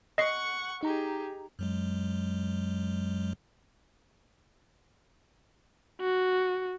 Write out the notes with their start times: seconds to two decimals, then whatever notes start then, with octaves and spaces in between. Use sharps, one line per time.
0.18 D#5 F#5 C#6 C7
0.83 D#4 G4 G#4 A#5
1.59 F#2 F#3 G#3
6.00 F#4